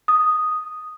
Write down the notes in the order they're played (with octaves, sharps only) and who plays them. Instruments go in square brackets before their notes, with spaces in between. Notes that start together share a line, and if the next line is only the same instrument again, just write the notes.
[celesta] D#6